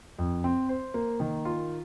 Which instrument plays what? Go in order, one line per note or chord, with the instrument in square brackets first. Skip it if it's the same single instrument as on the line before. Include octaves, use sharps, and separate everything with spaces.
[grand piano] F2
C4
C5
A#3
D#3
F4